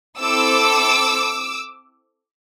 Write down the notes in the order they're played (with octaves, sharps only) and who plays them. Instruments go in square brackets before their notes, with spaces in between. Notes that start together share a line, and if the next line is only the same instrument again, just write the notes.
[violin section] C4 E4 A4 D6 E6